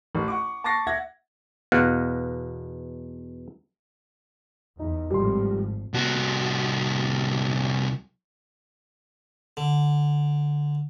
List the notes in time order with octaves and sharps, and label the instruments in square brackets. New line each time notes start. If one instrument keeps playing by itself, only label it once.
[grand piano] A1
F#5 C#6 D6
A5 C#6 D6 A6 A#6 C7
E5 F#5 G#6 A#6
[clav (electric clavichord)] E2 B2 F5 F#5
[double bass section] E2 [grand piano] D#4
[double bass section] G#1 A2 F3 [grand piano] G3 C6
[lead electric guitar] C2 F#4
[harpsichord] D3